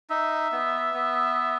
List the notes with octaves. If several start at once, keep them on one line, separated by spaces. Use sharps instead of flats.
D#4 E5
B3
B3